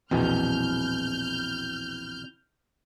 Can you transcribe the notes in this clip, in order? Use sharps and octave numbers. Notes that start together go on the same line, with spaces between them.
A#1 E2 B2 C4 E4 G#5 F6 G6